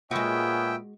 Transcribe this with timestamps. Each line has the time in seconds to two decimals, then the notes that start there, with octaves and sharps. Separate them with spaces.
0.11 A#2 G#3 B3 C#4 F#4 G#4 E5 G5